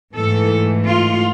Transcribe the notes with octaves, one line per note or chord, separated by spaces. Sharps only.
G#2 E3 A3 A4
F4